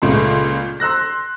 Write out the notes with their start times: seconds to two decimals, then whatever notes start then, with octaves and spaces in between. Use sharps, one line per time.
0.02 C#2 A#2 A3 C6
0.80 C6 E6 F#6 A#6